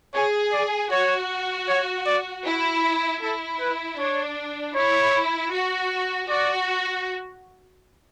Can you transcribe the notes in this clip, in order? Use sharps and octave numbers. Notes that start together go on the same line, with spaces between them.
G#4 C#5
D5
F#4 C#5
C#5
D5
E4
E4 A4
B4
D4 C#5
E4 C#5
F#4
F#4 D5